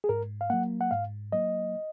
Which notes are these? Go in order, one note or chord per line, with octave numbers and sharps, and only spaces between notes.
G#4
G#2 A#4
F5
F#3 A#3 F#5
F#5
G#2 F5
F#3 A#3 D#5